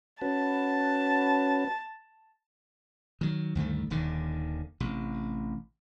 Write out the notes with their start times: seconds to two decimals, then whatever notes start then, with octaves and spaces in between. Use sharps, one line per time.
0.22 C#4 F#4 B4 A5
3.21 D#3 F#3
3.55 D2 G2 D#3 A3
3.90 D#1 D#2 D3 D#3
4.80 A1 C3